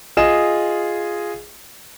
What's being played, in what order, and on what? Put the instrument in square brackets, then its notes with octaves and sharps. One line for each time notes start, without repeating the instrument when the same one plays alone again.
[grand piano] F4 G#4 D#5 E7